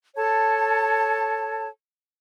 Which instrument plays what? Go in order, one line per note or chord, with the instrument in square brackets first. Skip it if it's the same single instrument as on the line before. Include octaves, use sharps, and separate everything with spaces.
[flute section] A4 C#5 A5